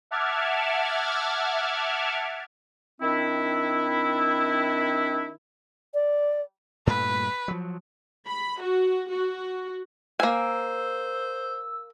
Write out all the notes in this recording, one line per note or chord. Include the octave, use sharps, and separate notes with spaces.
E5 F#5 A5 D6 F6 G#6
D#3 C4 D4 E4
D5
G2 A#2 A3 B4
F3 F#3
B5
F#4
F#4
A#3 C5 G#5 E6